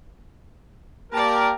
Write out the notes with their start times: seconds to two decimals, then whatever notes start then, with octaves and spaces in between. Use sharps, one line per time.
1.13 A#3 G4 A#4 D5 A5